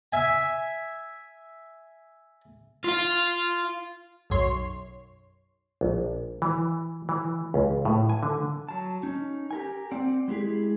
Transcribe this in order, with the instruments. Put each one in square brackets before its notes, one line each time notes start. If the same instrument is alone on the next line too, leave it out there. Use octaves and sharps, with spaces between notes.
[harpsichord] E5 G#5
[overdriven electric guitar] F4 F5
[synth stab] B1 F#2 C#5 C6
[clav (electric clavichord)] A#1
E3
E3
C#2
A2
G#5
D3
[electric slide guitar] F#3 A5
C#4 D#4
G4 A#4 G#5
C4 D5 F#5
G#3 E4 G4 G#4